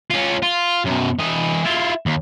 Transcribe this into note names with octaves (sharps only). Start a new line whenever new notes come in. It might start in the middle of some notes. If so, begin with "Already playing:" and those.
C#4 F4
F4
F#2 B2
E3 D#5
E4 F4
D#2